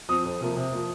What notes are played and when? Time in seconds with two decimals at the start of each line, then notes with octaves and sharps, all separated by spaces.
0.09 F3 C4 D#6
0.25 F2
0.40 C3 F3 A#3
0.57 C3
0.72 F3 A#3